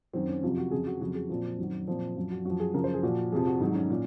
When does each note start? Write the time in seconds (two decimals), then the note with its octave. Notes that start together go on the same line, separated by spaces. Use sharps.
0.13 F#2 D#3 F#3 C4
0.28 C#4
0.42 F2 C3 F#3 F4
0.58 F#4
0.71 F2 C#3 F3 G#4
0.87 F#4
1.01 F2 C#3 F#3 F#4
1.15 G#4
1.29 A#2 F3 C4
1.59 F#2 D#3 F#3
1.87 A#2 F3 C4
2.16 F#2 F3
2.31 F#4
2.45 F#2 F3 F#4
2.60 G#4
2.74 F#2 C#3 F3 A#4
2.84 C5
2.94 G#4
3.03 A#2 F3 F#4
3.32 F2 C3 F3 G#4
3.47 F#4
3.60 G#2 D#3 F#3 D#4
3.75 C#4
3.90 A#2